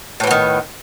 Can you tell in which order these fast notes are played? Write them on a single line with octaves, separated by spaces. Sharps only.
A2 E3 B3 D#3